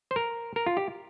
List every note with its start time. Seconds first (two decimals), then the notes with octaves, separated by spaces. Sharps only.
0.11 C5
0.16 A#4
0.56 A#4
0.66 F4
0.77 G4